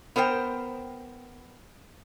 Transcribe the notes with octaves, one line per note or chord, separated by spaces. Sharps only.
B3 A#4 C5 G5